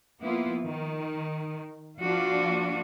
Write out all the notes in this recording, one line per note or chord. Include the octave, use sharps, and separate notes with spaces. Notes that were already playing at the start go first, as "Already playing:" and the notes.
F3 A#3 B3 E4 F4
D#3
F3 A#3 D4 F4 F#4